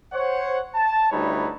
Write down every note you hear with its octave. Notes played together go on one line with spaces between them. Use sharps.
C5 C#5 F#5
A5
D2 G3 D#4 E4 B4 C#5